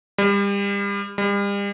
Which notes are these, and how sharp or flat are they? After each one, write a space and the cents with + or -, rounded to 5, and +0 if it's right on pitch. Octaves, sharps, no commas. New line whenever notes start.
G3 +35
G3 +40